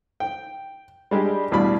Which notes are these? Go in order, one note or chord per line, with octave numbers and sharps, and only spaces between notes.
G5
G3 G#3 D4 G4
A1 E2 G2 B2 D5 B5